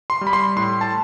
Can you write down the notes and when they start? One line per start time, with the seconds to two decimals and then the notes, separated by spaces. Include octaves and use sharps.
0.10 C6
0.21 G3
0.27 B5
0.33 C6
0.56 A2 C6
0.81 A5